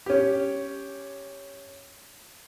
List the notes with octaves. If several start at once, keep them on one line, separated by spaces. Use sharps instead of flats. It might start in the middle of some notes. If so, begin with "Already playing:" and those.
C#4 G4